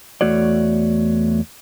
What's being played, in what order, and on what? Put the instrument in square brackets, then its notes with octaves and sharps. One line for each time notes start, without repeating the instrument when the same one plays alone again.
[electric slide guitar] E2 A3 F#4 C#5 D5